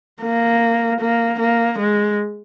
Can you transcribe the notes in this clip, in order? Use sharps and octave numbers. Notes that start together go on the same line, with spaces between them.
A#3
A#3
A#3
G#3